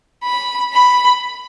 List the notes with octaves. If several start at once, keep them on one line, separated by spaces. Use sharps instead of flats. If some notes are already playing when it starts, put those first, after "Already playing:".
B5
B5